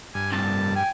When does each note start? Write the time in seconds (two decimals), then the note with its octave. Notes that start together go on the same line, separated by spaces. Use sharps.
0.15 G2 G#5
0.32 C2 F2 A5
0.76 G5 G#5